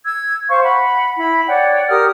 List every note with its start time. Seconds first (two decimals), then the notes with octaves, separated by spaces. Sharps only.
0.06 E6 G#6
0.49 C5 F5 C#6
0.63 F#5 B5
1.17 E4 B5
1.47 C#5 D5 F#5 G5
1.89 G4 A#4 D#6 F6